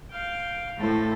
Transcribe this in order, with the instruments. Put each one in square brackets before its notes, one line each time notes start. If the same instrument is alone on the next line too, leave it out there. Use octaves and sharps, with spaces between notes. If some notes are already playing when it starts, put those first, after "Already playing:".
[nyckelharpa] F5 G5
[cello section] A2 [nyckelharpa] A4 C5